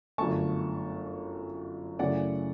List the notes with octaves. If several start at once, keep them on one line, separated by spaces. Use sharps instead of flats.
G1 F#2 D3 A3 A5 C#6
F#2 C#3 E3 A3 C#4 D5 F#5